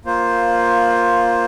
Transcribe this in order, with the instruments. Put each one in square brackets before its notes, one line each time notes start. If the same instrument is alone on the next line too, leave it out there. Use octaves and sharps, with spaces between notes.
[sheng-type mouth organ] A#3 F4 C5